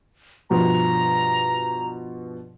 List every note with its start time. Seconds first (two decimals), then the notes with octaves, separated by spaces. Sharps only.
0.50 G2 B2 F3 A#5